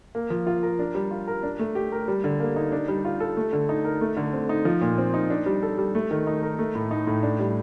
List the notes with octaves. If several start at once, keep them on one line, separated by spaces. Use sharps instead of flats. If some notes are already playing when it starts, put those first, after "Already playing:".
A#3
F3
F4
A#4
D4
G3
F4
A#4
D4
A3
G4
A#4
G3
D3
A#3
D#4
D4
G3
F4
A4
A3
D3
D#4
A#4
A3
D3
C4
D#4
F3
A#2
C4
D#4
D4
G3
A4
G3
A3
D#3
D#4
A#4
A3
A2
D#4
A2
D4
G3